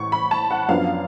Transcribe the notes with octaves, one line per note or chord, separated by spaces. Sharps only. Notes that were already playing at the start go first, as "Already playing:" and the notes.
Already playing: A1 A2 C#6
B5
A5
F#5
F#2 F3 B3 D4 F5